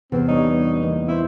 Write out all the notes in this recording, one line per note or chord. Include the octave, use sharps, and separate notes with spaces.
E2 C3 B3 C4
G3 D4 D#4 C#5
E3 A#3 B3
C4 E4 C5